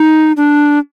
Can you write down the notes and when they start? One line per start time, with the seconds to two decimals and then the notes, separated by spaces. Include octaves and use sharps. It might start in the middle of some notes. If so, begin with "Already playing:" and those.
Already playing: D#4
0.37 D4